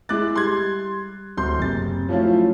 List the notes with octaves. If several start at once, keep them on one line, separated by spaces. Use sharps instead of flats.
G#3 E4 D6 F#6 A6
G3 C6 G#6
D1 C6 G6
F#1 C3 A6
F3 F#3 A3 C#4 E4 F4